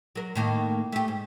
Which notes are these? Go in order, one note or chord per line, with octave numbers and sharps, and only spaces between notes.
F#3 A#4
A2 D#3 A#3
A3 G4
G#2